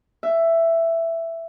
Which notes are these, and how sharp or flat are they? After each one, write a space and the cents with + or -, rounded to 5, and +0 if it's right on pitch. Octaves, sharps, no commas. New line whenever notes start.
E5 +10